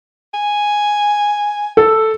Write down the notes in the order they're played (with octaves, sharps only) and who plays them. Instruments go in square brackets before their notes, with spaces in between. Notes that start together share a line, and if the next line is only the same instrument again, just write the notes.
[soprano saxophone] G#5
[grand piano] A4